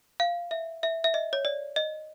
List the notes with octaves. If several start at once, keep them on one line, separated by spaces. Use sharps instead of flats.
F5
E5
E5
E5
D#5
C#5
D5
D#5